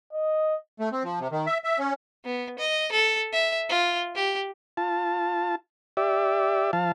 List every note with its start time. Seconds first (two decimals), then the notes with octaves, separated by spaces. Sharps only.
0.13 D#5
0.80 A3
0.92 C4
1.04 F3
1.20 C3
1.32 D#3
1.46 E5
1.64 E5
1.79 C#4
2.24 B3
2.59 D#5
2.92 A4
3.33 E5
3.69 F4
4.15 G4
4.77 F4 A5
5.97 G4 D5 E5
6.73 F3 F5 A5